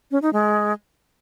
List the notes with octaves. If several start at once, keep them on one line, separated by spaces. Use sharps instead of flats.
C#4
D#4
G#3